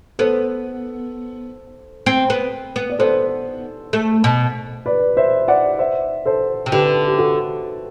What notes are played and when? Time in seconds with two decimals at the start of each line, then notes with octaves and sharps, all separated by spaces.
0.19 B3 A4 C5
2.06 C4
2.30 B3
2.76 B3
2.90 D5
2.99 B3 A4 C5
3.93 A3
4.24 B2
4.86 B4 D5
5.17 C5 E5
5.48 D5 F#5
5.79 C5 E5
6.26 A4 C5
6.66 C3
6.72 D3 G4 B4
7.08 G4
7.18 F#4 A4